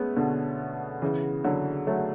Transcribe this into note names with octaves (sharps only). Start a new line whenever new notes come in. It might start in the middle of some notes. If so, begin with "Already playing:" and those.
Already playing: G#3 A3 B3 C#4
B2 D3
C#3 E3
D3 F#3
F#3 A3